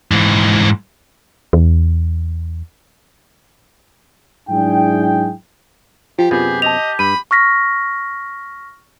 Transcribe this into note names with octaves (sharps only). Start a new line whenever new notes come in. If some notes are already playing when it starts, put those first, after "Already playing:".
G#2 E3
E2
G#2 F#3 D4 E4 G#4 G5
F3 F4 G4
F#2 C3 B3 G4 G#4
D#5 A5 F7
G2 B5 D#7
C#6 F6 A#6 B6